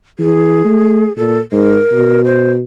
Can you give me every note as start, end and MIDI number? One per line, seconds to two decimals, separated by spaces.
0.19 0.60 52
0.19 1.16 68
0.65 1.05 57
1.17 1.39 46
1.17 1.39 69
1.52 1.78 44
1.52 2.22 70
1.92 2.61 47
2.25 2.51 72